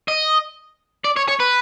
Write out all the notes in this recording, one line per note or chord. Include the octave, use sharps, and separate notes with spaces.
D#5
D5
C#5
C#5
B4